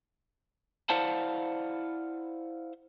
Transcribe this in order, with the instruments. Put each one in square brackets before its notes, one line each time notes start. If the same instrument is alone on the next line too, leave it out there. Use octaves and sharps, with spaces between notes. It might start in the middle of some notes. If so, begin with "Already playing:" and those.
[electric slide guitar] E4 C5 D5 F5 F#5 A5